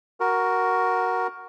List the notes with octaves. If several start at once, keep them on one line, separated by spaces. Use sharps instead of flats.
F#4 A#4